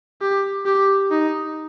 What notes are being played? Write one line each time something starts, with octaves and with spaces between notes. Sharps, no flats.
G4
G4
D#4